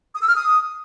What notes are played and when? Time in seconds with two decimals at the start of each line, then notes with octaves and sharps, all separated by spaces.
0.14 D#6
0.21 E6
0.28 F6
0.35 D#6